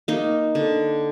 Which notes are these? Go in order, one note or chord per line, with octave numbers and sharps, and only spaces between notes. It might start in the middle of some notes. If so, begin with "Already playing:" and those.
A#3 D#4
D3